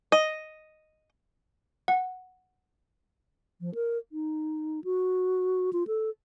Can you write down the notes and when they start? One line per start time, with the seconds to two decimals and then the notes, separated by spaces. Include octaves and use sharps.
0.12 D#5
1.88 F#5
3.61 F3
3.75 A#4
4.12 D#4
4.84 F#4
5.73 F4
5.87 A4